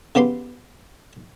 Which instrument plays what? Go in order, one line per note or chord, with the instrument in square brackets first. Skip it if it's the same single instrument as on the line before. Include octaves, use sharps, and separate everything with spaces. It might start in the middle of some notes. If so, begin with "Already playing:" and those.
[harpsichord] C#3 B3 G4 B5 C6